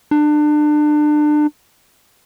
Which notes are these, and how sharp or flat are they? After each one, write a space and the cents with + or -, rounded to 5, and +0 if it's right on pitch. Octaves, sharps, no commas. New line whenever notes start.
D4 +30